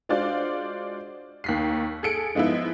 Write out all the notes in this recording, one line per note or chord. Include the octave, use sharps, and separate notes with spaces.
G#3 D4 F4 F#4 C5 D5
D#2 B6 C7
G#4 A4 C#7 D7
F3 G#3 B3 D#4 E4